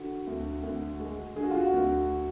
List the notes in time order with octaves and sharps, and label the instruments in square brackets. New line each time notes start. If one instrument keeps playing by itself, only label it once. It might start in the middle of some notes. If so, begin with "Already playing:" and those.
Already playing: [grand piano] D3 F#4
D2
D2
G#3
D3 G#4
F#4
F4
F#4
D2